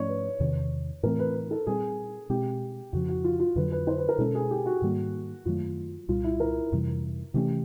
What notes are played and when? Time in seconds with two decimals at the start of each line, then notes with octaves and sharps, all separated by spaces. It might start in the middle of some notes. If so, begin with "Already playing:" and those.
Already playing: G#2 F3 A3 C#4 C#5 D5
0.08 B4
0.40 E2 C3 D#3
1.03 A2 E3 A3 C4 A#4
1.19 B4
1.35 B4
1.51 A4
1.67 A#2 G3 C4 G#4
2.30 B2 G#3 C4 G4
2.93 F2 C#3 F3 F#4
3.09 F#4
3.24 F4
3.40 F4
3.55 F2 D3 F#3 B4
3.72 B4
3.87 C5
3.98 B4
4.09 A#4
4.18 B2 G#3 C#4 A4
4.35 G#4
4.51 G4
4.66 F#4
4.82 G#2 D#3 G3 A#3
5.45 F#2 D#3 F#3 A3 F4
6.08 C2 A#2 G3 F4
6.24 E4
6.40 A#4
6.72 F2 C3 E3 G3
7.34 C3 E3 A3 C#4 G4